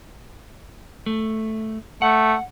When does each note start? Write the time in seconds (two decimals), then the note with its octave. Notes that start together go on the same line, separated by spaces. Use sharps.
1.06 A3
2.02 A3 F#5